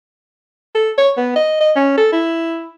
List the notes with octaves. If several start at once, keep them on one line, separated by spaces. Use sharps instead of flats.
A4
C#5
B3
D#5
D#5
C#4
A4
E4